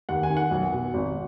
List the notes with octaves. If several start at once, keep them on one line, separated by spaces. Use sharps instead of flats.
D#2 F#5
G#5
D#3
F#5
B1
B2
G#1